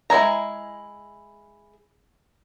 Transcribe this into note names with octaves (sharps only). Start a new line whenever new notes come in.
G#3 E4 G#5 A#5